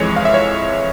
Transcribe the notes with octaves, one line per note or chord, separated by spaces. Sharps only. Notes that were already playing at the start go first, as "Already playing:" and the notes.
Already playing: F2 E3 G#3 C#5
F5
E5
C#5